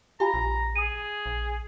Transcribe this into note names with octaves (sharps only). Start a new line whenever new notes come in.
F4 G4 G#5 A#5 B5
A#1
G#4 D#6 D#7
A#1